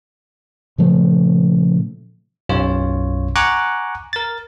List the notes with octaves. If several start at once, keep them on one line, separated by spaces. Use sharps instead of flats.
A#2 C#3 F3 A3
B1 F#2 F4 C#5
F#5 G#5 A#5 C#6 D6 F#6
A#4 A6